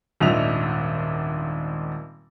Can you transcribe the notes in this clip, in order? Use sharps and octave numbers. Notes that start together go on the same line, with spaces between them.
D#1 G#1 D4 D#5 E5 F7